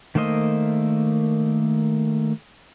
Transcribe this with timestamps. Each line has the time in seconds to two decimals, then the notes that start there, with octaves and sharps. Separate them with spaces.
0.15 D#3 A3 A#3 C5 D#5